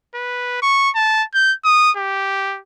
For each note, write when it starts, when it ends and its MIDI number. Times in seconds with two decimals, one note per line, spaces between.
0.15 0.60 71
0.62 0.90 85
0.95 1.23 81
1.34 1.53 91
1.65 1.91 87
1.97 2.59 67